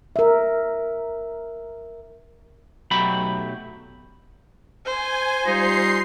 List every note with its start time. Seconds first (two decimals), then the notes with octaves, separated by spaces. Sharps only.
0.16 A#4 E5
2.91 B1 F#3 A3 G4 B5
4.86 C5 G#5
5.46 G3 D#4 F4 C6 C7